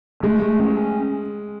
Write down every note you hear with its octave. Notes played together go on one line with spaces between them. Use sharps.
G#3 A3
A3
C#4